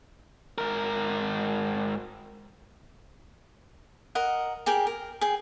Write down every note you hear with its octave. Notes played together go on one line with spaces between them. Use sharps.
G#2 A#4
A#4 D#5 F#5
G4 G#4 A#4 G5
A#4
G#4 G5